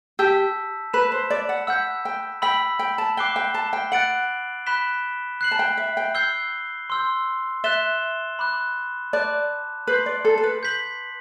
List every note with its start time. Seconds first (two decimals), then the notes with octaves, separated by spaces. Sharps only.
0.19 G4 A5 E6 G6 B6
0.93 B4 B5 F#6 B6 E7
1.12 C5
1.30 D5
1.49 F#5
1.67 F#5 E6 G6 B6
2.05 G5
2.42 G5 B5 E6 B6 F#7
2.79 G5
2.98 A5
3.17 G5 D6 F#6 C7 E7 G7
3.36 G5
3.54 A5
3.73 G5
3.92 F#5 F#6 A6 D7 F#7
4.66 B5 F#6 B6 E7 G7
5.41 F#6 C7 F#7
5.51 A5
5.59 G5
5.77 E5
5.97 G5
6.15 E6 G6 C7 G7
6.90 C6 E6 G6
7.64 E5 F#6 A6 E7 G7
8.39 B5 D6 F#6
9.13 D5 A5 D6 F#6
9.87 B4 C6 G6 C7 F#7
10.06 D5
10.25 A4
10.38 A4
10.43 B4
10.63 G6 B6 F#7